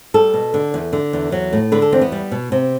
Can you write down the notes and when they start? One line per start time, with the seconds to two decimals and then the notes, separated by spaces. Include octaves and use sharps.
0.14 G3 A4
0.34 B2
0.54 D3
0.74 E2
0.93 D3
1.13 E2
1.32 F#3
1.53 A2
1.72 D3 B4
1.82 A4
1.92 E2 C4
2.01 B3
2.12 G3
2.31 B2
2.52 C3